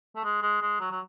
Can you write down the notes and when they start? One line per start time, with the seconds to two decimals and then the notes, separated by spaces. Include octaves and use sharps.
0.16 A3
0.24 G#3
0.42 G#3
0.62 G#3
0.81 F#3
0.91 F#3